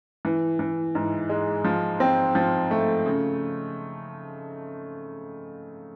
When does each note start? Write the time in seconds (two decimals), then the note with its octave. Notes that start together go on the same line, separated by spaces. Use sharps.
0.25 E3
0.59 E3
0.95 G#2
1.29 G#3
1.65 F3
2.00 C4
2.35 F3
2.71 A3
3.06 C#3